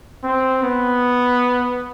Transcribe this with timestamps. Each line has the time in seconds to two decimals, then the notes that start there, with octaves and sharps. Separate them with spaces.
0.23 C4
0.63 B3